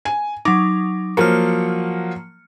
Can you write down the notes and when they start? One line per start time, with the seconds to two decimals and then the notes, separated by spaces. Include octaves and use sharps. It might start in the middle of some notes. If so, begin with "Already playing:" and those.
0.05 G#5
0.45 F#3 D#4 D6
1.17 F3 F#3 A#3 F6 C#7